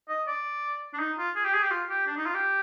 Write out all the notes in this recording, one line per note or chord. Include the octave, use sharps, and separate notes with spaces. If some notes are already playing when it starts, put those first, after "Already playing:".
D#5
D5
D4
D#4
F4
G#4
G4
G#4
G4
F4
G4
D4
D#4
F4
G4